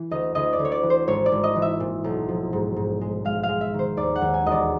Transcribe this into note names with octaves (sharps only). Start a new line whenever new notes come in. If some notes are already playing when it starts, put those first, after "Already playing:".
Already playing: E3
D2 D#5
D2 D#5
D5
D2
C#5
D5
E3
C5
G#1 C#5
D5
G#1
D#5
E3
E5
A#2
B1
F3
G#2
G#2
G#3
G#3 F5
F5
G#3
E5
D#3
C5
D#2 D5
F#5
D#2
G#5
E1 D#5
D5